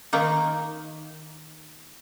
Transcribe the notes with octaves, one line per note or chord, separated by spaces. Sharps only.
D#3 A#3 D#4